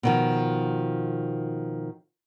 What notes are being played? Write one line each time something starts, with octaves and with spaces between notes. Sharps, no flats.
B2 D#3 F3